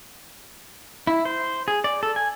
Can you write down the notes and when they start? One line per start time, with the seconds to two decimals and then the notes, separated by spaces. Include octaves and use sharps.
1.07 E4
1.25 C5
1.68 G#4
1.84 D5
2.03 A4
2.16 G#5